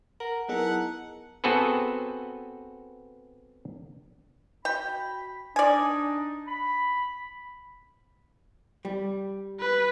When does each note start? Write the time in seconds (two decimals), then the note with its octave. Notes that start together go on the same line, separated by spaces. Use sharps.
0.20 A#4 F#5
0.49 F#3 B3 D#4 E4 G#4 A#4 F#5 A5
1.44 B3 C4 F#4 G#4 A4 B4
4.65 F#4 G5 B5
5.56 D4 D#4 D5 G#5
6.47 B5
8.85 G3
9.60 B4